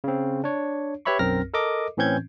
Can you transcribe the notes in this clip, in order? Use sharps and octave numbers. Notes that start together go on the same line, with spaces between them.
C#3 C4
D4 C#5
G4 B4 C#5 E5 B5 C#6
B1 F#2 C4 A#4 F6 A#6
A4 A#4 D#5 D6
A2 E3 C4 C#4 G6 G#6